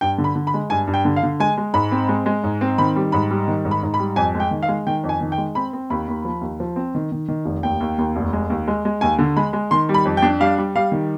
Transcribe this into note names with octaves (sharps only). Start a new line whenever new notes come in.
G2 G5
D3
B5
D3
B5
G#3
G2 G#5
G2
G5
D3
F5
D3
G#3 G#5
G#3
G#2 B5
C4
G#3
G#3
G#2
C4
D#3 B5
G3
G#2 B5
G3
D#3
G#2
B5
G#2
B5
G3
F2 G#5
G#3
G5
D#3
F5
G#3
D#3 G5
F2
G#5
D#3
G5
G#3
C4 B5
C4
D#2 B5
D#2
F3
D#2
F3
C4
D#3
D#3
D#3
F1
D#2 G5
D#2
D#2
F1
G#3
D#2
G#3
G#3
D#2 G#5
D3
G#3 B5
G#3
D#3 C6
G3
B5
F2
G5
D4
G3 F5
G3
G3 F5
D#3